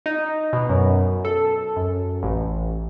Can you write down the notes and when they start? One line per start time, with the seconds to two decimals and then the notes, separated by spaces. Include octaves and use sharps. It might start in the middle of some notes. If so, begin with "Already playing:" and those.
0.06 D#4
0.53 B2
0.69 F#2
1.25 A4
1.77 F#2
2.23 A1